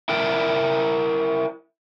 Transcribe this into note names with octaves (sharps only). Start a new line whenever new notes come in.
E4 A#4 G5